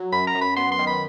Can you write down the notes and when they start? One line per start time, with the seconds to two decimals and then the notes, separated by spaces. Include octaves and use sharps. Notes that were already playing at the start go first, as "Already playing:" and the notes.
Already playing: F#3
0.12 F#2 B5
0.27 A#5
0.35 F#2
0.41 B5
0.57 B3 C6
0.72 C6
0.79 D#3
0.87 B5